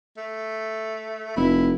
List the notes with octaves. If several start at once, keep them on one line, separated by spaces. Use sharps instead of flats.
A3
F1 E4